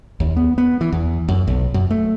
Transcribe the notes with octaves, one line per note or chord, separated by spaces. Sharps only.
D#2
B3
B3
E3
E2
F#2
B1
F#2
A3